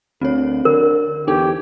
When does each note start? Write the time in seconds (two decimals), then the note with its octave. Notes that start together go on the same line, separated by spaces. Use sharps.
0.21 D2 C4 C#5
0.65 D3 A#4
1.27 E2 D4 D#4 G4 A4